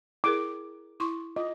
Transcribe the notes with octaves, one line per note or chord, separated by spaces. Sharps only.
E4 G#4 A#4 D6
E4 C6 C#6
F4 D#5